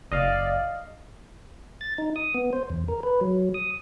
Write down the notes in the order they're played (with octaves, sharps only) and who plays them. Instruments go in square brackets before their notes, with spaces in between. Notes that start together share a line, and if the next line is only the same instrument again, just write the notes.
[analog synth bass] F#1 [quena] D5 [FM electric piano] D#5 F5
[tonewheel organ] A6
D#4
D#6
B3
C5
E2
A#4
B4
F#3
D#6